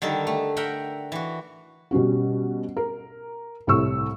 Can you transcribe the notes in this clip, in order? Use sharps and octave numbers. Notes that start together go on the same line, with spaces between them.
D3 D#3 G3 A4
A3
A#4 E5 F#5 G5
E3 F#4
B2 G3 C#4 F#4
A#4
C2 A2 A4 C#6 E6